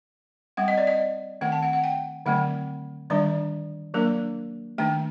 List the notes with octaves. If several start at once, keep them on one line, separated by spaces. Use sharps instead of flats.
G3 C4 F#5
D#5
D5
D#5
D#3 A3 C4 F#5
A5
F#5
F#5
G5
D3 F#3 A3 C4 F#5
D#3 G3 D4 D5
F#3 A#3 D4 A#4
D#3 A3 D4 G5